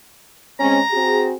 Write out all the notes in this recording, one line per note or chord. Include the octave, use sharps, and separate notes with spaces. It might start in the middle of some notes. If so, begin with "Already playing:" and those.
G#3 C4 C#4 A#5
C4 F#4 G#4